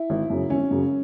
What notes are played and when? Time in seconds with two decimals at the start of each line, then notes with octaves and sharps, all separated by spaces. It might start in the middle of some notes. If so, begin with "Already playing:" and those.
Already playing: E4
0.10 G#1
0.30 F#2 C#3 F#3
0.50 G#1 C#4
0.71 F#2 C#3 F#3